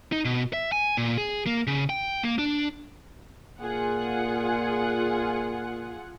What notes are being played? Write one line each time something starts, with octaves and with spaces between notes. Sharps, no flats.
D#4
B2
E5
G#5
A#2
G#4
A#3
C#3
G5
A#3
D4
A#2 F4 G#4 F#5